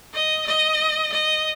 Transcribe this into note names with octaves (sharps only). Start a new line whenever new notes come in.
D#5
D#5
D#5